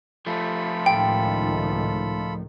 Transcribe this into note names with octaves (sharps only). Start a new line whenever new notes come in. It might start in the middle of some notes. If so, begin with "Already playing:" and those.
F3 A3 F4 A4 B5
C#2 A2 D#3 G5